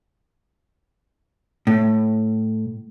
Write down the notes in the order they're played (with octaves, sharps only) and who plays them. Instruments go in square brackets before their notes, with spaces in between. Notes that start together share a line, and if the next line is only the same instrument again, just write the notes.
[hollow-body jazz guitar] A2